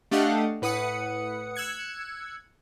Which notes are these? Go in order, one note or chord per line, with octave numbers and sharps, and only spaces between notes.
A3 D4 G4 D#5 F5 F#5
A2 B4 F#5 D#6 C#7
E6 F#6 G#6 C#7